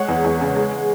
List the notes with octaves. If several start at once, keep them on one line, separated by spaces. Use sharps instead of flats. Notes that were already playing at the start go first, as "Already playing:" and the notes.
Already playing: G#3 C#5 F#5
E2
E2
C#3
G#3